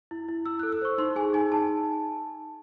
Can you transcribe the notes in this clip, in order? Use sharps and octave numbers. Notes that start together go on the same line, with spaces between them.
E4
E4
E4 E6
A4 F#6
E6
C5 C#6
D#4 C6
G#4 G#5
D#4 G#5
D#4 A5